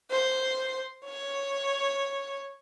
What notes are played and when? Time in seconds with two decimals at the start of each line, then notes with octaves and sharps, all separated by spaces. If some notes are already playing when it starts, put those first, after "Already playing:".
0.11 C5
1.05 C#5